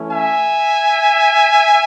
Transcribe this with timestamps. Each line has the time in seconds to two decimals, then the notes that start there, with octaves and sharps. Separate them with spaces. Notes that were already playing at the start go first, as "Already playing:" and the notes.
Already playing: E3 A3 C#4 E4
0.11 E5 G#5